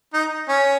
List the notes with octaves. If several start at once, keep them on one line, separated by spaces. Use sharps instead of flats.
D#4
C#4